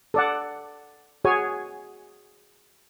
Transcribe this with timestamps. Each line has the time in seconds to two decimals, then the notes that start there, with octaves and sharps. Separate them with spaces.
0.14 A4 D5 F#5
1.25 F#4 G#4 C#5 G#5